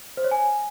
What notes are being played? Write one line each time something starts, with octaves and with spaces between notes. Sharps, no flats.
C5
C#5
G#5